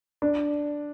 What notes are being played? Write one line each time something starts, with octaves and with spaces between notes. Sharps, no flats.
D4